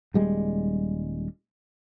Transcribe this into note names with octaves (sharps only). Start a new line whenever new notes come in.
D#1 G3 G#3